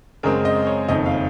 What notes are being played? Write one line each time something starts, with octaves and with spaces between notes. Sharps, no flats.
F#2 C#3 G#3 C4 A#4
D#5
C#5
F#1 F2 D#3 D#5
F5